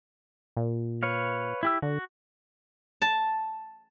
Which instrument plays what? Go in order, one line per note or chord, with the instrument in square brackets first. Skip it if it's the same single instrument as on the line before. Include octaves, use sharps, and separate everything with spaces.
[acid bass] A#2
[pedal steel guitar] B4 C#5 F5
E4 G4 E6
[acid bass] D3 [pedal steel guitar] F#4
[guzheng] A5